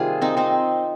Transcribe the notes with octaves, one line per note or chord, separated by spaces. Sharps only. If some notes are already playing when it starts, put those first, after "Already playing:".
Already playing: C3 D#3 G3 A#3 F4 G#4
C4 D#4
C4 D#4